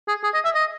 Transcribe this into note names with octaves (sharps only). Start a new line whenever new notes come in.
G#4
G#4
D#5
E5
D#5